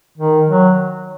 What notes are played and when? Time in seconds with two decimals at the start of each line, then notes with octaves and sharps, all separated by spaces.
0.18 D#3
0.48 F#3